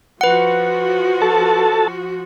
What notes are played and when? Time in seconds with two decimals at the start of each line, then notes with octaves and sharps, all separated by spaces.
0.21 F3 F#4 B4 F#5
1.22 A4 A5